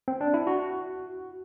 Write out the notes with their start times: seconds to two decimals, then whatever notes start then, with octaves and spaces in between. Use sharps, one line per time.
0.08 C4
0.21 D4
0.34 E4
0.47 F#4